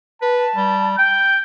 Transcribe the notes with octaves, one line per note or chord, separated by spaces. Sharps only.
B4 A5
G3
G5 G6